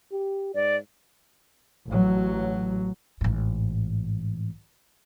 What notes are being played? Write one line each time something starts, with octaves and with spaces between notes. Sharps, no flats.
G4
G#2 D5
A1 F#3
A1 G#2